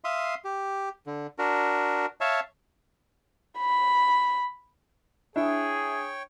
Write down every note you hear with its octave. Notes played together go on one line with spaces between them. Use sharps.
E5 F5 C6 D#6
G4
D3
D4 F#4 A#4
C#5 E5 F5 A5
B5
D4 E4 G#4 C#5 G5